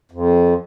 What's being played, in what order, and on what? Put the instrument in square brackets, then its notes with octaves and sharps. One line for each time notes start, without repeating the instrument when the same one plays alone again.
[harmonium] F2